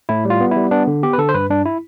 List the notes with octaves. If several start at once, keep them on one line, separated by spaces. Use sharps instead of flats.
A2 E4
G3
F4
B3
G3 E4
B3 D4
D3
B3 G4
B4
D3 A4
C5
G2 B4
G2 D4
E4